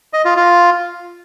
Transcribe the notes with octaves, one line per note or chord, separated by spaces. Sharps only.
D#5
F4
F4